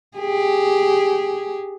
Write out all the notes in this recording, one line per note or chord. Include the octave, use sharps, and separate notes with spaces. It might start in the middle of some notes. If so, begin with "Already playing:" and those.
G4 G#4